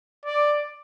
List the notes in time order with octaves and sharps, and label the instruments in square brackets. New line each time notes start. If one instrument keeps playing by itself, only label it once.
[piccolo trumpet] D5